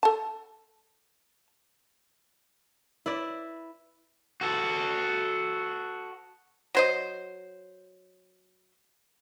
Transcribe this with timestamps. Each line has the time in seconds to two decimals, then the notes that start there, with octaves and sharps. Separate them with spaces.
0.03 A4 A5
3.06 E4 B4 D5 E5
4.41 F#4 A4
6.75 F#3 C5 D#5